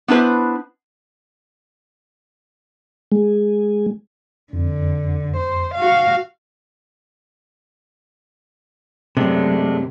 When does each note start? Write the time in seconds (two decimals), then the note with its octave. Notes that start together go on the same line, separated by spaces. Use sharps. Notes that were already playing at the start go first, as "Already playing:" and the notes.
0.08 B3 D4 E4 B4 C5
3.12 G#3
4.53 F2 D3
5.37 C5
5.74 F#4 F5
9.17 F#2 C3 F#3 G#3 A3 D4